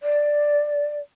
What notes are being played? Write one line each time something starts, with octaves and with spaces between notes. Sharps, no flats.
D5